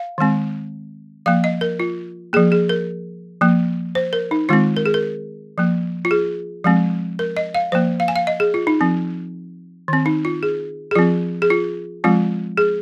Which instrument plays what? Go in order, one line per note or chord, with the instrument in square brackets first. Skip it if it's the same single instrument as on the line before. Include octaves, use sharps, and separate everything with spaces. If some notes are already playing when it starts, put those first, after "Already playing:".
Already playing: [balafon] F5
D#3 G#3 C4
F3 A#3 F5
D#5
A#4
F4
F3 A#3 G#4
G#4
A#4
F3 A#3
C5
A#4
D#4
D#3 G#3 C4 F4
A#4
G#4
A#4
F3 A#3
F4
G#4
F3 G#3 C4
A#4
D#5
F5
F3 A#3 C5
F5
G#5
F5
D#5
G#4
F4
D#4
F3 C4
D#3 C4
D#4
F4
G#4
G#4
F3 C4 F4
G#4
F4
F3 G#3 C4 F4
G#4